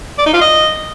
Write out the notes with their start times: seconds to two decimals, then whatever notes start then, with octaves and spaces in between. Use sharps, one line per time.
0.18 D5
0.26 D#4
0.34 F4
0.41 D#5